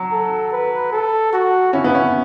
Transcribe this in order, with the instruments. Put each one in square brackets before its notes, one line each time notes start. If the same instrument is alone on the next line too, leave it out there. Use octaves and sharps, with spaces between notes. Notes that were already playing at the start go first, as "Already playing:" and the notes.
Already playing: [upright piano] F#3
[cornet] A4
B4
A4
F#4
[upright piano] C#4 [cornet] E4
[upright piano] B3
C#4